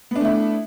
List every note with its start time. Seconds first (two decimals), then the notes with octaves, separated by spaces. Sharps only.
0.11 B3
0.16 D4
0.20 A3
0.25 E4